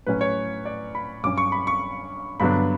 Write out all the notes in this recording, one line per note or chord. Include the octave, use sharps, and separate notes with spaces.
A2 F#3 C#4 B4
C#5
D5
B5
G2 F#3 C#4 D6
C#6
B5
C#6
G2 D3 F#3 B3 D4 B5